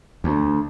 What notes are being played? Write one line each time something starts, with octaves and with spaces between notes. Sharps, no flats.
D2